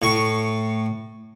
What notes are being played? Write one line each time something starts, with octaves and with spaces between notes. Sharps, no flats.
A2 C#6